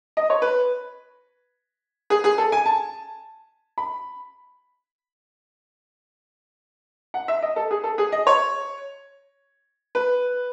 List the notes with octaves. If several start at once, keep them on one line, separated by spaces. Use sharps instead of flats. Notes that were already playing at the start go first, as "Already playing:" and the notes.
D#5
C#5
B4
G#4
G#4
A4
G#5
A5
B5
F#5
E5
D#5
A4
G#4
A4
G#4
D#5
C#5
B4